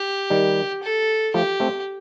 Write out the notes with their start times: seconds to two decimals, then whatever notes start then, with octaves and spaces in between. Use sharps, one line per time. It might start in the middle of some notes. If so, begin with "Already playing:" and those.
Already playing: G4
0.30 D#3 G3
0.83 A4
1.34 F3 A3 G4
1.60 A3 C4